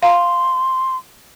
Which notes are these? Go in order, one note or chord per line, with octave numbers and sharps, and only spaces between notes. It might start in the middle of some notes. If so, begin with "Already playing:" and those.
F5 A#5 C6